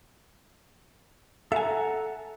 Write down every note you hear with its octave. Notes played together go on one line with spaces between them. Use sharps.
A4 E5 F#5 G#5 A#5